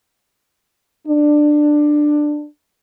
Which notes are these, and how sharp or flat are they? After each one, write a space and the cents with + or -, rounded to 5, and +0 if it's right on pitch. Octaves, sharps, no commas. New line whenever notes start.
D4 +15